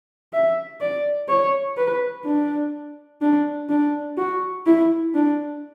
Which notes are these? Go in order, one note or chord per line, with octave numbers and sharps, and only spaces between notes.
E5
D5
C#5
B4
D4
D4
D4
F#4
E4
D4